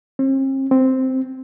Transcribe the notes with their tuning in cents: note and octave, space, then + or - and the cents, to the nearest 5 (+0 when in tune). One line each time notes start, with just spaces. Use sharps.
C4 +40
C4 -5